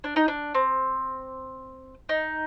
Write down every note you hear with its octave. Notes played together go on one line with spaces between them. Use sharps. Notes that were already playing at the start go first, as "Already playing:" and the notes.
D4
D#4
D4
C4
D#4